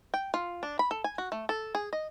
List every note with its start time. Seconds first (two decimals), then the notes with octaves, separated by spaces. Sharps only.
0.14 G5
0.34 F4
0.63 D4
0.79 B5
0.91 A4
1.04 G#5
1.18 F#4
1.32 A3
1.49 A4
1.75 G#4
1.93 D#5